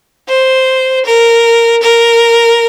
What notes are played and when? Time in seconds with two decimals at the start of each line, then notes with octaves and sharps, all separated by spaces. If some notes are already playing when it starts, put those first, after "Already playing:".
0.29 C5
1.05 A#4
1.82 A#4